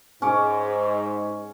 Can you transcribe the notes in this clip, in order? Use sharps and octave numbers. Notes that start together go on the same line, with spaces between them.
G#2 C#4 D6